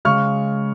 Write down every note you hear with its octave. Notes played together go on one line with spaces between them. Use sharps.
C#3 G#3 C#6 F6